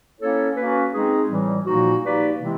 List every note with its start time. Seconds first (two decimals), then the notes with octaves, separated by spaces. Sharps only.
0.19 A#3 C#4 E4 A4 C#5
0.56 A#3 C#4 F#4 B4
0.93 G#3 C4 D#4 G#4
1.29 A2 E3 G3
1.66 A#2 F3 A#3 D#4 F#4
2.02 A#3 D#4 G4 B4 D5
2.38 C3 E3 G#3 C4 E4